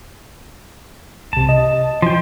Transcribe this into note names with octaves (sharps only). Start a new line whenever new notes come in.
C2 C3 A5
D#5
F3 G5 C6